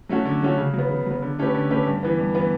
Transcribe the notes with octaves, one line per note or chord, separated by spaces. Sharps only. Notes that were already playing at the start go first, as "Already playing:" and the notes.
F#3 A3 C#4 F#4
D3
F#3 A3 C#4 F#4
C#3
F#3
B3
C#3
F#3 B3
D3
A3 C#4 G4 B4
D3
A3 C#4 G4 B4
G2
E3 B3
G2
E3 B3